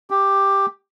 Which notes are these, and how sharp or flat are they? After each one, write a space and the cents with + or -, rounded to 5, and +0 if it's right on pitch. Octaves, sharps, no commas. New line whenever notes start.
G4 +5